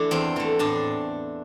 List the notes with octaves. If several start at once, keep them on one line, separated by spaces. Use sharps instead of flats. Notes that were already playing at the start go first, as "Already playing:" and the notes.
Already playing: E3 A3 D4 E4
E2 C4
E3 A3
A2 D4